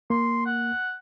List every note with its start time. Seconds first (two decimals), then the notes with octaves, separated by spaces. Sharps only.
0.10 A#3 C6
0.46 F#5